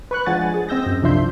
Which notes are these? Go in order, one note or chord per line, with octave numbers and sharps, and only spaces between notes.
B4 C#6 F#6
F3 G#3 D4 F#5 G#5 A6
G#4
C4 D#5 E6 G6 A#6
F#2
C2 F3 D4 E5 C6 G6